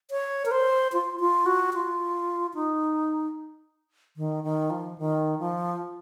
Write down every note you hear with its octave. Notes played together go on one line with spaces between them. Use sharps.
C#5
A#4
C5
F4
F4
F#4
F4
D#4
D#3
D#3
F3
D#3
F3